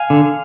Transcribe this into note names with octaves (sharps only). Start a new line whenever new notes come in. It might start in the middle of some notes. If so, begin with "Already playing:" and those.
Already playing: F5 G#5
D3